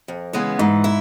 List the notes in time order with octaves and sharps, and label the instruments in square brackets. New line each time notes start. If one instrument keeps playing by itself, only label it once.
[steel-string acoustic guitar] F2
C#3 E3 G#3 B3
[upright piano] G#2 [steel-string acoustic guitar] E3
[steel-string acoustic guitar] E4